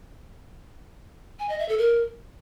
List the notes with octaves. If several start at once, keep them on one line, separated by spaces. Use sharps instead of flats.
G#5
D#5
E5
A4
A#4